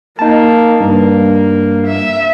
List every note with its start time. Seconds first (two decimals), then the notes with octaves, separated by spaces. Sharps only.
0.19 A#3 D#4 A5
0.81 G2 A#3
1.86 E5